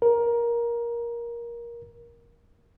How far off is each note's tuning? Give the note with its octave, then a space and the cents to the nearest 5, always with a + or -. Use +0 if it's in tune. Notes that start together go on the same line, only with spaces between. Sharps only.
A#4 +15